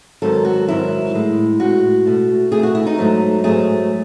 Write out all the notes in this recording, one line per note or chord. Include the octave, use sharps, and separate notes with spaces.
G#2 D#3 F#3 A4
F#4
G#2 D#3 F#3 E4
A2 G#3
A2 G#3 F#4
B2 A3
B2 A3 G#4
F#4
E4
D#4
G#2 F#3 A3
G#2 F#3 A3 G#4